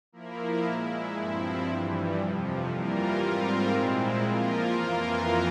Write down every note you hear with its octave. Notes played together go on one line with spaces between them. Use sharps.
F3 A#3 E4 A#4
A#2 G#3 E4
G2 F3 C4 E4
G2 E3 G3
F2 C3 F3
E3 G3 A#3 F4 A#4
G#2 G3 C4 F4 A#4
A#2 G#3 C4 E4
F3 A#3 F4 A#4
F2 E3 A#3 F4 A#4